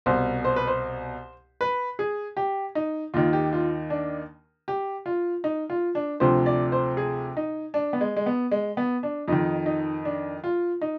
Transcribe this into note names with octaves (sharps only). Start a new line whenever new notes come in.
C2 B2 C5
C5
B4
C5
B4
G#4
G4
D#4
D#2 D#3 F4
G4
F4
D4
G4
F4
D#4
F4
D4
D2 C3 F3 C5
D5
C5
G#4
D#4
D4
B3
G#3
G#3
B3
G#3
B3
D4
F2 D#3 D#4
D#4
D4
F4
D#4